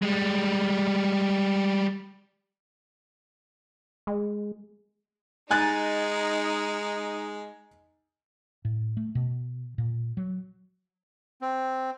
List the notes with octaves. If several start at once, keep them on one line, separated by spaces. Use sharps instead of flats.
G3 G#3
G#3
G#3 D#4 G#5 F#6 A6
A2
A3
B2
A#2
F#3
C4